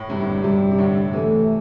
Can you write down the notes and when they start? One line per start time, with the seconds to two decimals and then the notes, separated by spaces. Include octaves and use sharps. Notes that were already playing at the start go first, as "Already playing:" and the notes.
Already playing: A2
0.09 G2 C3 G3
0.20 A2 D3
0.44 G2 C3
0.71 C3
0.78 A2 D3
1.13 C3 E3 A3